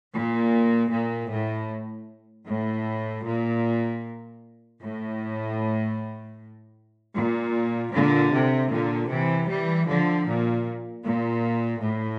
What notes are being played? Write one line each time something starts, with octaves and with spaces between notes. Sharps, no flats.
A#2
A#2
A2
A2
A#2
A2
A#2
A#2 D3
C3
A#2 D3
C3 E3
E3 G3
D3 F3
A#2
A#2
A2